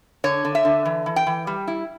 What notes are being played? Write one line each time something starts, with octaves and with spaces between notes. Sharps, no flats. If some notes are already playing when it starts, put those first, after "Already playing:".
D3 C#5
D3
E5
D3
E3
E3
G5
E3
G3
E4